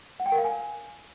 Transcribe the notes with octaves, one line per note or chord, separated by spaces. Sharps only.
F#5
G5
A#4
F5
G#5